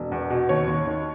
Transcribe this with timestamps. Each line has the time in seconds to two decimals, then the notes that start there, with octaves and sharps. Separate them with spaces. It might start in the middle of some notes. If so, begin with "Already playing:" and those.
Already playing: E1
0.12 E2
0.30 B2
0.49 D#2 C#5
0.67 D#2
0.87 D#3